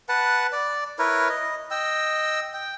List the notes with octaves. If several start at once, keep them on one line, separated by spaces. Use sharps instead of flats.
B4 F#5 A5
D5
E4 A#4 B4 C#5
D#5
D#5 G5 E6
G5